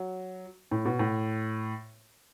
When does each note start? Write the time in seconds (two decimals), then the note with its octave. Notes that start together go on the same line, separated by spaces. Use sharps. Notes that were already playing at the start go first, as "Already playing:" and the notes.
Already playing: F#3
0.71 A2
0.85 B2
0.99 A2